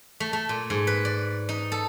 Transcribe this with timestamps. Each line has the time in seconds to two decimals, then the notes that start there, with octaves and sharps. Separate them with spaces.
0.20 A3
0.33 A3
0.49 A#2
0.70 G#2
0.87 B4
1.05 D5
1.49 D#4
1.72 A4